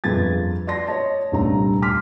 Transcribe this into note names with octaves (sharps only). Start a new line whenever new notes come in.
G1 F2 G#4 B4 G#6 A6
D5 A5 C6 A#6
C#5 D#5 A5
D#1 C2 G2 G3 A3 A#5
C6 D6 F6 B6